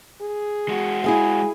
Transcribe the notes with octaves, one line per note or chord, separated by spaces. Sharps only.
G#4
G#3 F#4
E4 G#4 F5 G#5